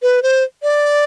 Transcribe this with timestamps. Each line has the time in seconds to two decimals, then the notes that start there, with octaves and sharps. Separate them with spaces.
0.02 B4
0.23 C5
0.63 D5